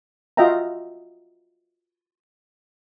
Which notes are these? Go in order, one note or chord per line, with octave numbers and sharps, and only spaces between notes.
F4 F#4 D#5 E5 G5 A#5